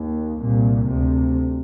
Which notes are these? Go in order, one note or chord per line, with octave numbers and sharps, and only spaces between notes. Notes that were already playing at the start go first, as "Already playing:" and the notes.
Already playing: D#2
C2 A#2
D2 C3